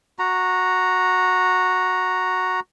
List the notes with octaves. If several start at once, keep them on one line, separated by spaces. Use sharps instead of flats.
F#4 A#5